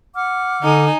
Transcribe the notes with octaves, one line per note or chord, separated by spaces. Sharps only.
F#5 D6 F6
D3 D#4 G#5